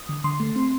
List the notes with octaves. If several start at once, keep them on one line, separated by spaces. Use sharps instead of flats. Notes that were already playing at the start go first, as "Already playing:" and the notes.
Already playing: D#6
D3
D3 C6
A3
C4